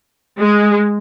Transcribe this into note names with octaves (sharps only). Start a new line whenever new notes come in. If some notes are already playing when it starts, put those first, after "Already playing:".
G#3